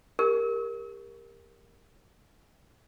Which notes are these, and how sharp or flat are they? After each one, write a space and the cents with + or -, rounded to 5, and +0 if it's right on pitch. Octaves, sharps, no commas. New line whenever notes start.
G4 +35 A#4 +5